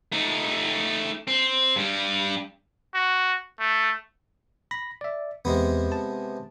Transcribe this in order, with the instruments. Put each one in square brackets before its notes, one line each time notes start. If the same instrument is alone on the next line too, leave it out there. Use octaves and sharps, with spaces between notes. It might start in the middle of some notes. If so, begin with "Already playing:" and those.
[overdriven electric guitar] A3 D#4
C4
G2 G3
[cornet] F#4
A3
[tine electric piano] B5 A#6
D5 E5
[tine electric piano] E2 [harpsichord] C3 G#3 B3
[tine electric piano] A5